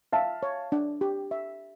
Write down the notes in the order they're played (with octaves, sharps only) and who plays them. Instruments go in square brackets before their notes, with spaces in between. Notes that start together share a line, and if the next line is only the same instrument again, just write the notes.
[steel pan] E5 [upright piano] F5 A5
[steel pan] C#5
D4
G4
E5